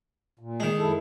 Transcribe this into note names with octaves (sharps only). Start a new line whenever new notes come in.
A#2
D#3 G#3
F#2 E4 A4